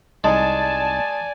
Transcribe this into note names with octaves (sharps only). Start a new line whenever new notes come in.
C2 G#3 D#4 D5 G#5 A5